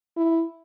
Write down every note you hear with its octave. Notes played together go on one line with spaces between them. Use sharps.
E4